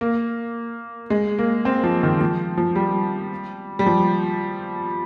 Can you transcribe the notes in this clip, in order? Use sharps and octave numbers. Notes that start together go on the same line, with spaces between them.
A#3
G#3
A#3
C4
F3
D#3
F3
F3
G3
G3
F3